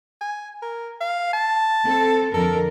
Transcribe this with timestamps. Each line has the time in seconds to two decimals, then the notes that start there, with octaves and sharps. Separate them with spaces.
0.21 G#5
0.62 A#4
1.01 F5
1.33 A5
1.86 C4 A4
2.34 F2 D3 A4 A#4